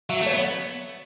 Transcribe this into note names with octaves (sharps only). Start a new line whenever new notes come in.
F#3 E5
A3
C#5
B3